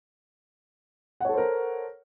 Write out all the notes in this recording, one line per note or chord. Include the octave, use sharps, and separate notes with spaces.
A4 A#4 C5 C#5 F#5